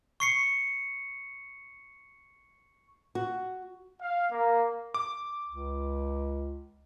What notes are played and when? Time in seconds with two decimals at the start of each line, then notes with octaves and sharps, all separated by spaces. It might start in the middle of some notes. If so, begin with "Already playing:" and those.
0.20 C#6 C7 C#7
3.15 F#4
4.01 F5
4.31 A#3
4.94 D6
5.48 C#2